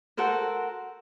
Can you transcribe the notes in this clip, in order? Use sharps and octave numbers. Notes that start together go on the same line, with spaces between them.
F#4 A4 A#4 C5